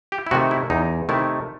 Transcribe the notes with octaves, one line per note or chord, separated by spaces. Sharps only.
G4
E4
C3 D#3 A3 F#4
E4
E2 D#4
C3 D#3 A3 E4